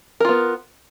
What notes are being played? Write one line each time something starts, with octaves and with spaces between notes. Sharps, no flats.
B3 F4 A#4